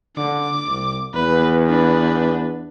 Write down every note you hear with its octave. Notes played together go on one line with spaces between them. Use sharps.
D3 D6
C2
E2 B4
D4 B4